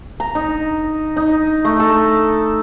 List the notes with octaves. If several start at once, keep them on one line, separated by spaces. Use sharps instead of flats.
A#5
D#4
D#4
A3
A4